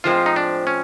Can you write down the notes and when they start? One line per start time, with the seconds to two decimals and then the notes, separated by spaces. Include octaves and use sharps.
0.04 A2 F3 G#3 C4 F4
0.26 D#4
0.36 D4
0.67 C#4